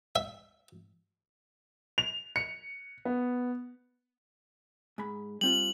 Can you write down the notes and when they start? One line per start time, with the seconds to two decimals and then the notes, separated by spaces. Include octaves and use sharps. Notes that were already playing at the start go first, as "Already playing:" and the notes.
0.16 E5
1.98 F7
2.36 C#7
3.05 B3
4.98 G#2 B5
5.41 G3 C4 F4 F#7